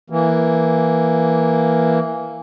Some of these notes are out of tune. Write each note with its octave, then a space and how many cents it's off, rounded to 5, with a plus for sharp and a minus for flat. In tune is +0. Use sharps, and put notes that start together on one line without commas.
E3 +5 A#3 +0